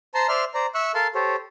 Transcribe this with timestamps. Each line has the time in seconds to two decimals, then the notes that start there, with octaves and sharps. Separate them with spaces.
0.14 C5 A5 A#5 C6
0.28 C5 D5 E5 C6 F6
0.54 C5 D5 A#5
0.74 E5 C#6 E6 F#6
0.95 A4 A#4 F5 A5 C6
1.15 G4 A4 C5 C#5